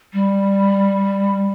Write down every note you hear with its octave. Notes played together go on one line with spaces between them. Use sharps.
G3